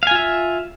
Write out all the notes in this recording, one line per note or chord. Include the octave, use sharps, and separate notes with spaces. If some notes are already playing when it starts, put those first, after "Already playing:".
F4 E5 F5 G#5